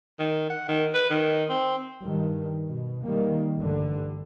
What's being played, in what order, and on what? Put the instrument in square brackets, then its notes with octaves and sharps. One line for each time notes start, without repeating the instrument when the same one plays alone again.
[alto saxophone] D#3
F#5
D#3
B4
D#3
C4
[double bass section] G2 D#3
B2
D#3 G3 A#3
A1 G2 D3